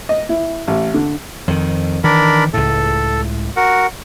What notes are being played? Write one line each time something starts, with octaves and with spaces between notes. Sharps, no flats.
D#5
E4
A1
D3
F2 D#3
D#3 E3 D4 A#4 B5
C#2 A2 A4
F#4 A#4 F#5